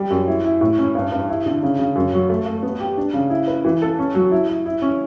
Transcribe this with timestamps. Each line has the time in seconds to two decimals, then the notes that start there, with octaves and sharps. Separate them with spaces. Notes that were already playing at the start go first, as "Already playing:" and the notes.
Already playing: G3
0.10 F#2
0.27 E4
0.45 E4
0.61 A2
0.78 C#4
0.95 G2
1.12 G2
1.29 E4
1.46 D3
1.63 C#3
1.79 C#3
1.95 F#2
2.13 F#3
2.29 A3
2.46 A3
2.63 B3
2.80 G4
2.98 D4
3.13 C#3
3.30 E4
3.48 B4
3.65 E3
3.82 A4
3.99 C#4
4.15 F#3
4.31 E4
4.49 E4
4.66 E4
4.82 C#4